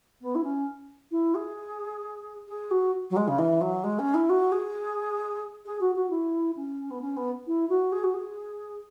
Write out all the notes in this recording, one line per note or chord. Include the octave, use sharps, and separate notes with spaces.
B3
E4
C#4
E4
G#4
G#4
F#4
F#3
G#3
C#3
E3
F#3
G#3
C#4
E4
F#4
G#4
G#4
F#4
F#4
E4
C#4
B3
C#4
B3
E4
F#4
G#4
F#4
G#4